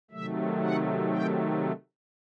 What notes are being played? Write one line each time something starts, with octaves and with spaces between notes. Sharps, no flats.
C3 D#3 F#3 A3 E5
F#5
G5